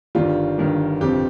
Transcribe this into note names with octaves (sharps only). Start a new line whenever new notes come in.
G1 G2 D#3 G3 F4
G1 G2 D#3 G3
G1 F2 C3 F3 G4